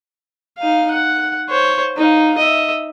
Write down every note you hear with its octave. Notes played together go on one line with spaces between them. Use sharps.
D#4 F5
F#5
C5 C#5
D#4 F5
D#5 E5